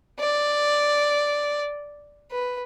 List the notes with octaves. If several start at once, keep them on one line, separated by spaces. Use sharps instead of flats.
D5
B4